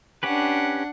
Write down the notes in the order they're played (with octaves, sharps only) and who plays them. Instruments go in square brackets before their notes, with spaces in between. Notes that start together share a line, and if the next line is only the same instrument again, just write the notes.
[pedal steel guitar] C#4 G4 B4 [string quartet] D4 F#5